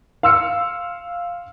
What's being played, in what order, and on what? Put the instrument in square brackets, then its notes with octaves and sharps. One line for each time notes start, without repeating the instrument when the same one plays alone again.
[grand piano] F5 C6 E6 F6 C#7